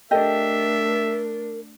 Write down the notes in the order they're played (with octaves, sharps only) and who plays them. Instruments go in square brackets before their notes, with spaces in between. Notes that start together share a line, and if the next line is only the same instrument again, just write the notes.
[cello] A3 D4 [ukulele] G4 A4 D#5 [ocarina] A#4 [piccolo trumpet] E5